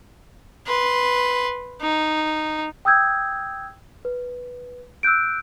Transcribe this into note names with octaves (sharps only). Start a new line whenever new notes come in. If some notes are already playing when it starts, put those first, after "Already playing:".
B4 C6
D#4
G5 D#6 E6 G6 G#6
B4
E6 F#6 G6 D7